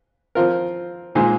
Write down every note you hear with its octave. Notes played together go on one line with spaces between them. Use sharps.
F3 C4 F4 A#4
A#2 G#3 D#4 G#4 C5